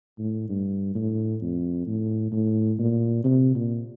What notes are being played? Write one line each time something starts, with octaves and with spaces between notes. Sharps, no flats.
A2
G2
A2
F2
A2
A2
A#2
C3
A#2